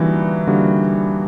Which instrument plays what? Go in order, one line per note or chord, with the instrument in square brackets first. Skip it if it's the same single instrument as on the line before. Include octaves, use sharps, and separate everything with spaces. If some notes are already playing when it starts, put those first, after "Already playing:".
Already playing: [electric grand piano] D3 G3 A#3 D#4 F#4 [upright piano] E3
[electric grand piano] D3 G3 A#3 D#4 F#4